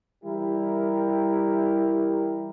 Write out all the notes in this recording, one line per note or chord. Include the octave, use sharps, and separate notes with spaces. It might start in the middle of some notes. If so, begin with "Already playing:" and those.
E3 G3 E4 G4 A#4